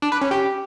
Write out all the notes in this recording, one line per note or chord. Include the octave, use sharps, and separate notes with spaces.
D4
B4
C#4
G4